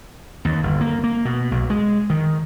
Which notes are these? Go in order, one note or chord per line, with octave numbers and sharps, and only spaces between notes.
D#2
G1
A#3
A#3
B2
B1
G#3
D#3